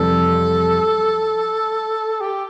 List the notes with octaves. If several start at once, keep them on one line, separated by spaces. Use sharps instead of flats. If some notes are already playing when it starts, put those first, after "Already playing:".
Already playing: F2 C3 E3 G3 A4
G4